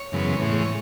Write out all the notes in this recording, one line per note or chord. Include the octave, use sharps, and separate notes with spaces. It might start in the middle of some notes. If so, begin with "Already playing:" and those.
Already playing: C#5
F#2 C#3 E3 G#3 B3
A2 E3 G#3 C#5
C#5